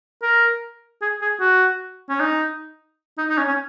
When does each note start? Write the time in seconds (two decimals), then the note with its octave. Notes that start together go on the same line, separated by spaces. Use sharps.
0.22 A#4
1.01 G#4
1.21 G#4
1.40 F#4
2.09 C#4
2.20 D#4
3.18 D#4
3.29 D#4
3.38 C#4
3.48 C#4